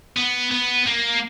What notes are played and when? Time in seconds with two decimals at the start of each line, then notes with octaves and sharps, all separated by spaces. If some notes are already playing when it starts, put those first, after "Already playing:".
0.17 B3
0.51 B3
0.87 A#3